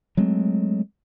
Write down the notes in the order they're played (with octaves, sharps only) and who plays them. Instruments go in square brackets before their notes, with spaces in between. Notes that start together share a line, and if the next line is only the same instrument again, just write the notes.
[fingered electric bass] F#3 G#3 A3 C4